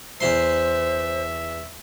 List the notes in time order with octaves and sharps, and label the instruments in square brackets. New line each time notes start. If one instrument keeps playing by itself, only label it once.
[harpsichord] E2 E4 C6 [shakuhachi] C5 [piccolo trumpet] E5